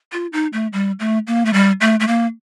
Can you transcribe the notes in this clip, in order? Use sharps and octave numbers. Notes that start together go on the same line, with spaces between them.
F4
D#4
A3
G3
A3
A#3
A3
G3
A3
A3
A#3